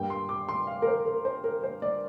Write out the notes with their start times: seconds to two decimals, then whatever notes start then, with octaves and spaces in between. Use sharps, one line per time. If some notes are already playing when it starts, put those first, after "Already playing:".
Already playing: G2 G3 A#3 G5
0.10 C6
0.29 D6
0.48 C6
0.67 F5
0.82 A#4
0.87 C5
1.06 A#4
1.25 C5
1.44 A#4
1.63 C5
1.82 D5